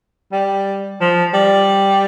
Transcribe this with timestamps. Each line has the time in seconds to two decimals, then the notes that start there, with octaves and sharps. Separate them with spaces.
0.32 G3
1.01 F3
1.34 G3